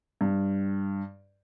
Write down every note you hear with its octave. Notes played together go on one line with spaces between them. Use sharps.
G2